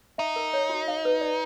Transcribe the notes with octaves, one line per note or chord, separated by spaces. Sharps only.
D#4 E5
A#4
C#5
F#4
F5
B4
D5